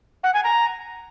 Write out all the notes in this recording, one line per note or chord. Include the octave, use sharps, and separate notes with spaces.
F#5
G#5
A#5